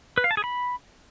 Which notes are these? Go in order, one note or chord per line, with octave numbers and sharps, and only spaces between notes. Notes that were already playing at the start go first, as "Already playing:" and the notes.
B4
F5
A5
G#4
B5